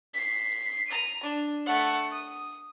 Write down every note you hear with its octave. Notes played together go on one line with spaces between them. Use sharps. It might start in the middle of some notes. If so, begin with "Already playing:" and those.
B6 C7
A#5 D#7
D4
A3 F#5
D#6